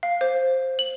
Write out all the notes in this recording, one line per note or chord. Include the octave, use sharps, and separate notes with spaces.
F5
C5
F#7